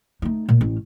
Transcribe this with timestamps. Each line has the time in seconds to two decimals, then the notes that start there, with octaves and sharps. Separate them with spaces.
0.22 A3 D#4
0.49 A#2
0.61 A1 C#4